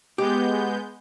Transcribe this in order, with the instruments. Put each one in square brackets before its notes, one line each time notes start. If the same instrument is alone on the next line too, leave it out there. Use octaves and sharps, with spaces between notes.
[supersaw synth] G#3 B3 G6 [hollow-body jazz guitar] G4